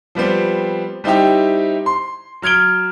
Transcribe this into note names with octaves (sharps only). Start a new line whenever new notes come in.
F3 G3 B3 C4
G3 C4 D#4 E4 G4
C6
F#3 F6 G#6 D7 G7